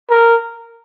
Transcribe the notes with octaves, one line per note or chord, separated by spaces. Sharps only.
A#4